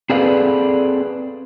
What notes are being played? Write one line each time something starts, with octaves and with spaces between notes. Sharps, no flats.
C4 G#4 A4 B4 D5 F5